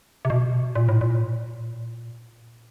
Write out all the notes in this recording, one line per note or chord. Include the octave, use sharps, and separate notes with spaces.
C3
B2
A#2
A2
A#2